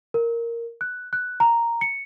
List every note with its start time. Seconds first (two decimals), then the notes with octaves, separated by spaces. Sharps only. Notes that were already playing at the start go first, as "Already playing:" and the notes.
0.14 A#4
0.81 F#6
1.13 F#6
1.40 A#5
1.81 C#7